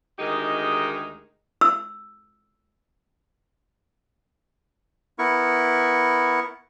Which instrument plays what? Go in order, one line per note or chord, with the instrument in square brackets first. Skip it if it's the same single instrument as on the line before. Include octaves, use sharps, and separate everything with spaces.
[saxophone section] D2 D#3 G#3 D#4 G4 A#4
[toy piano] E6
[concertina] B3 E4 A#4 C#6